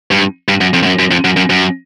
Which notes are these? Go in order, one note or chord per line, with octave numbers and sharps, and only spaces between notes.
G2
G2
F#2
F2
G2
F#2
F#2
F2
F#2
F#2
F#2